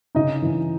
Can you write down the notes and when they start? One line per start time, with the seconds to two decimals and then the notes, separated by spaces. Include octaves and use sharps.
0.15 C#3 D#4 D#5
0.42 E3